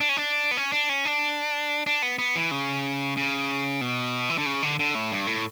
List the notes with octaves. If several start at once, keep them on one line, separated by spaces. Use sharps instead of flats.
D4
C#4
D4
B3
C#4
D4
C#4
D4
D4
B3
B3
E3
C#3
C#3
B2
E3
D3
C#3
D3
D3
A2
G2
A2